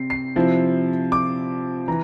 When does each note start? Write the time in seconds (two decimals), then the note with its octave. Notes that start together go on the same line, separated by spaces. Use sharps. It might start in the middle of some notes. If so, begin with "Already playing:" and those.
Already playing: C3 C4 C7
0.10 C7
0.36 C3 F3 C4 E4
1.12 D6
1.88 E3 A#5